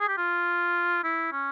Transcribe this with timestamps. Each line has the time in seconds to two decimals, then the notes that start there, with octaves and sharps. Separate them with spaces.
0.01 G#4
0.08 G4
0.18 F4
1.04 E4
1.32 C#4